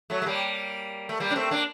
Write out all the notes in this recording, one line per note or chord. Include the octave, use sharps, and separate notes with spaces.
F#3 A3
A3
G3 A#3
A3
G3 A#3
D4
A3 C4
A#3 D4